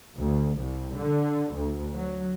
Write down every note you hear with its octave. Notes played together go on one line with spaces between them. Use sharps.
D2
C2
D3
D2
F#3